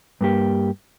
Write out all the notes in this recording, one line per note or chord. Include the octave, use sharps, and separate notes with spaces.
G2 A#3 G4